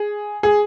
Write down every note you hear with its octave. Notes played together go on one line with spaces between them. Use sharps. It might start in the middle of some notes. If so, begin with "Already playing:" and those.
Already playing: G#4
G#4